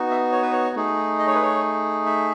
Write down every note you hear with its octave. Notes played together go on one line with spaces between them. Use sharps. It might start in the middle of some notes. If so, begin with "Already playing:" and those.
Already playing: B3 D#4 F#4
E5
C#5
B4
C#5
A3 D#4 G#4
D#5
C#5
B4
C#5
E5